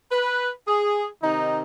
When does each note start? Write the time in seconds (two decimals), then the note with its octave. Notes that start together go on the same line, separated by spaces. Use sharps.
0.11 B4
0.67 G#4
1.23 C3 D#3 D#4